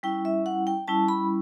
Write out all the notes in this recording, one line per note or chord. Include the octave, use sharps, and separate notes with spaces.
G3 C#4 E4 G5
E5
F#5
G5
G3 C#4 E4 A5
B5